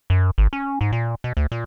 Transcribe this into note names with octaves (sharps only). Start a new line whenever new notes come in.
F#2
G#1
C#4
G#2
A#2
B2
D2
A#2